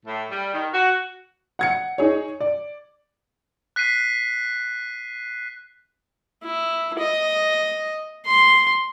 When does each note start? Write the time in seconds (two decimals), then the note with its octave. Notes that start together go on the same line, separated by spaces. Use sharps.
0.05 A2
0.30 G3
0.52 D#3
0.72 F#4
1.59 F#5 G#6 C#7
1.98 D#4 G#4 C#5
2.41 D5
3.76 F#6 B6 C7 D#7
6.44 E4
6.99 D#5
8.26 C6